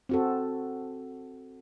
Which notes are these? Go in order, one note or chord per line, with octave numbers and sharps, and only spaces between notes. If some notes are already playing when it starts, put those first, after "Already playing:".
C4 F#4 A4